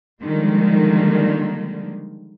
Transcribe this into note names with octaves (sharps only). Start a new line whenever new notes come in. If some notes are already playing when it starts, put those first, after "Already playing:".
D3 D#3 F3 G3 G#3 A#3